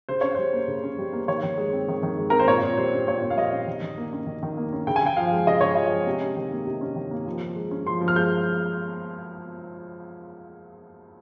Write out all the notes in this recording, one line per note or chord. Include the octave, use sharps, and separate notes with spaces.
C#3 C5
C#4 C#5
G3 C5
A#3
C#3
C#4
G3
A#3
D#3 C#5
D#3
G#3
C4
D#3
D#3
G#3
C4 A#4
C5
A#2 C#5
A#2
G3 C5
C#4
A#2 C#5
A#2
F5
G3 D#5
C#4
D#3
D#3
A#3
C#4
D#3
D#3
A#3
C#4
C#3 G5
G#5
C#3 G5
F3 F5
G#3
C#3 D#5
C#3 C#5
F3 D#5
G#3
C3
C#4
D#3
A#3
C3
C#4
D#3
A#3
F3
F3
G#3
C#4
F3 C6
F3
F6
G#3 G6